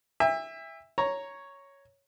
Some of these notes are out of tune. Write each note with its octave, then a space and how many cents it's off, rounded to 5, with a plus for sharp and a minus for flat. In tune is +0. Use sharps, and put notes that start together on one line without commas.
E5 +0 G5 +45
C#5 +0 A#5 +0